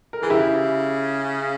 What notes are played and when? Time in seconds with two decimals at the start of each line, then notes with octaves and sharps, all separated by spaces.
0.13 A#4
0.22 E3 G#4
0.30 C#3 E4 G4